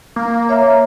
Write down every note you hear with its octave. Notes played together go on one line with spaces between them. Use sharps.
A#3
C#5 E5 A#5